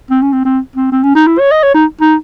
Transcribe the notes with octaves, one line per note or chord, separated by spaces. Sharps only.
C4
C#4
C4
C4
C4
C4
C#4
D#4
E4
C#5
D#5
C#5
D#4
D#4